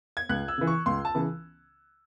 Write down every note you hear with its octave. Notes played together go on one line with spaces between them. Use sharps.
G#6
C#2 F#6
E6
C#3 E3
C#6
C#2 C6
A5
C#3 E3